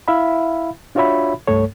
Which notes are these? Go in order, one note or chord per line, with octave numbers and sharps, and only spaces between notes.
E4 E5 F5 B5
D4 F4 F#4 C#5 E5 B5
C2 G2 A3 A4 C#5